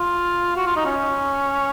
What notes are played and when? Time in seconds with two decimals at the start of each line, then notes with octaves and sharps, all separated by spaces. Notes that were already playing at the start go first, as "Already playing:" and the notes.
Already playing: F4
0.56 F#4
0.67 F4
0.76 D#4
0.86 C#4